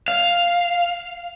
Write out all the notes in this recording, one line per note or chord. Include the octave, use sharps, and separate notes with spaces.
F5